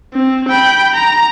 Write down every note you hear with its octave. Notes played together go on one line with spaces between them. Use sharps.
C4
G5 B5
A#5